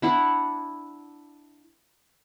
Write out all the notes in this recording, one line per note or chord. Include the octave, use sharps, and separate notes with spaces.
D4 E4 F#5